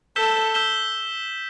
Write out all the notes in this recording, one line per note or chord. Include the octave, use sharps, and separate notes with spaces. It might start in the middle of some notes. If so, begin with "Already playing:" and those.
A4 E6 G6 B6 E7 G7
E6 G6 B6 E7 G7